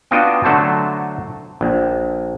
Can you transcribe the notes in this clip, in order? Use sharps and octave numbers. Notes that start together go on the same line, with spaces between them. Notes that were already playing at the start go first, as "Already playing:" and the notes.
B3 D4 F4 F#4 D#5 G5
D3 F#3 A3 C5 A5
A#1